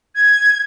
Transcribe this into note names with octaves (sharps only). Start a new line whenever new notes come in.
G#6